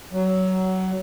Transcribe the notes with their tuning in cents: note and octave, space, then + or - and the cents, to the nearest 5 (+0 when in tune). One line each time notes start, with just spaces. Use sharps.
F#3 +20